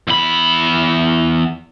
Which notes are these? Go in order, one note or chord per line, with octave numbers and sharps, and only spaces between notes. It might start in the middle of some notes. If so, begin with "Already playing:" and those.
E2 B5